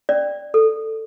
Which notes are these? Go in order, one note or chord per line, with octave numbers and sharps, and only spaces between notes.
C#4 D5
A4